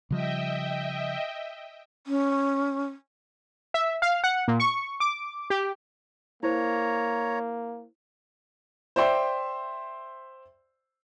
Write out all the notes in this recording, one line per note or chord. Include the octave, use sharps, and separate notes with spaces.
C#3 F3 G3 D#5 E5 G5
C#4
E5
F5
F#5
A#2
C#6
D6
G4
A#3 E4 C5 C#5 A#5
C5 D5 E5 G5 C6